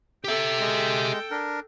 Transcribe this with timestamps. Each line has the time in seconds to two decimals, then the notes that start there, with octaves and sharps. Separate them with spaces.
0.24 G4 A4 E5 G5
0.60 G#3
1.31 D4 A#4